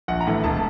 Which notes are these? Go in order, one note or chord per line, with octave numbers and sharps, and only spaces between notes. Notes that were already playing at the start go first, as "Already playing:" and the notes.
A#1 F#5
A#5
A2 E3 A3
E1 A5